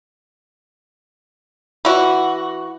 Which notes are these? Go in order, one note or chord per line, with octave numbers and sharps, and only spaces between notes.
E3 F#4